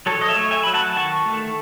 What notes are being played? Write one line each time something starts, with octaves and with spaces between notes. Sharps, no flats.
F#3 A4 C#5
D#5
C#5 E5
A3
E5 G#5
F#3 B5
F#5 A5
D#3 A5 C#6
A3